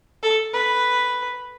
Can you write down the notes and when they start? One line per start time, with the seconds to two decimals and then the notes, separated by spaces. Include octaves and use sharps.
0.23 A4
0.53 B4